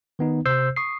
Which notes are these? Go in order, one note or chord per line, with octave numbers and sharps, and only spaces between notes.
D#3 B3 D#4
C3 C5 E6 G6 C7
C#6 D#6 C7